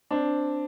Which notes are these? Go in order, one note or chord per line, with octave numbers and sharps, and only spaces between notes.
C4 D4